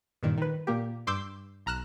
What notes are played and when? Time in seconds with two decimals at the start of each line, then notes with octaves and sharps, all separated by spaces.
0.23 G2 A#2 D#3
0.38 D#3 B4
0.67 A#2 A#3 G4
1.07 G2 C6 D6 E6 G6
1.66 B1 A#5 F6 F#6 E7